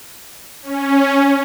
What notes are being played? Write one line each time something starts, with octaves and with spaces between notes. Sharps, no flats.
C#4